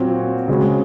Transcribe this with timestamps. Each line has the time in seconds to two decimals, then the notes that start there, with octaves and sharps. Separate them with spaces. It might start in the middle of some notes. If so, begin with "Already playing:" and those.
Already playing: A#2 F#3 C4 F#4 C#5
0.48 C#3 G#3 C4 F#4 C#5